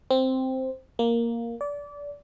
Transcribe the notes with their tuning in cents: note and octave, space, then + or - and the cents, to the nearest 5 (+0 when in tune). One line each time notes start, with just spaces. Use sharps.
C4 +0
A#3 +0
D5 -25